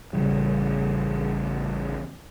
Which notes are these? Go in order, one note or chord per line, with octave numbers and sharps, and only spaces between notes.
A1 C#3 G3